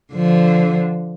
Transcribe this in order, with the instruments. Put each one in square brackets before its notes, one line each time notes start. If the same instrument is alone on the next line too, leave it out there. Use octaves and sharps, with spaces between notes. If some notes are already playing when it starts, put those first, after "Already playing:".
[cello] D3 F3